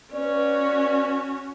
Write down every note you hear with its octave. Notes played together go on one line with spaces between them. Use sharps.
C#4 F#4 B4 D5